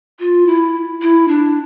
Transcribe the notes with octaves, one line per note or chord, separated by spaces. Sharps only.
F4
E4
E4
D4